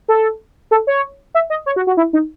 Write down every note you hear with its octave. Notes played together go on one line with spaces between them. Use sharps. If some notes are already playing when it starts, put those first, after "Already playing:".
A4
A4
C#5
E5
D#5
C#5
F#4
F#4
E4
D#4